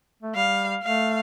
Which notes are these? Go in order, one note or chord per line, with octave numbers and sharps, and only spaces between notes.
A3
G3 F5
A3 F5